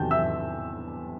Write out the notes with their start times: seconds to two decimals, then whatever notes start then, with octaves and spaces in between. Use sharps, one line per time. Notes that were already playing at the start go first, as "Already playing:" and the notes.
Already playing: E2 C3 D#3 F#3 G5 A5 G6
0.11 E5 E6